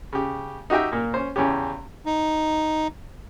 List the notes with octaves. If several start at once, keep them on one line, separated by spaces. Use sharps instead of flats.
C#3 G4
D#4 F#4 G4 E5 G5
A#2 A#3
C#4 C5
E2 C#3 C#4 G4
D#4